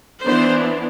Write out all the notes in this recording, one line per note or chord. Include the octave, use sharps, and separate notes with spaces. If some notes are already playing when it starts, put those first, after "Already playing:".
E3 B3 D4 C5